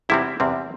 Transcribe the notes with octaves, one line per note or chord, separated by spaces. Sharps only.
E2 C3 G3 C4 E4
E2 C3 G3 C4